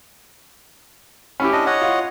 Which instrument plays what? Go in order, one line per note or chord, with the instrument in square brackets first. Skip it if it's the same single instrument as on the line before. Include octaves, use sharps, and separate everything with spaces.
[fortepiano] C#4 E4 G4
[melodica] D4 D#5
C#5 D#5 F#5
[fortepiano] F4